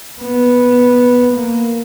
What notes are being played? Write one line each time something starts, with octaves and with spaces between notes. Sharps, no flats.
B3
A#3